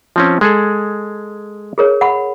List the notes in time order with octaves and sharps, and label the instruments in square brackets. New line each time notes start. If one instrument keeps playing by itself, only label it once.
[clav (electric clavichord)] F3 C4 C#4
G#3 G#4 A4
[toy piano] G#4 A#4 C#5
F#5 B5